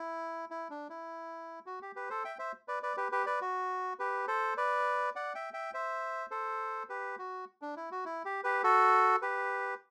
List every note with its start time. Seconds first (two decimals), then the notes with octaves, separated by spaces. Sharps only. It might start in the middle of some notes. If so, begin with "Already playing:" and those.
Already playing: E4
0.51 E4
0.70 D4
0.90 E4
1.66 F#4
1.82 G4
1.96 G4 B4
2.10 A4 C5
2.24 E5 G5
2.39 C5 E5
2.68 B4 D5
2.83 B4 D5
2.97 G4 B4
3.12 G4 B4
3.26 B4 D5
3.41 F#4
3.99 G4 B4
4.28 A4 C5
4.57 B4 D5
5.16 D5 F#5
5.35 E5 G5
5.53 E5 G5
5.74 C5 E5
6.31 A4 C5
6.89 G4 B4
7.19 F#4
7.62 D4
7.76 E4
7.91 F#4
8.05 E4
8.25 G4
8.44 G4 B4
8.64 F#4 A4
9.22 G4 B4